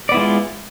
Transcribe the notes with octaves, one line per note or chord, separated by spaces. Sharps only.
G#3 B3 E4 F4 D5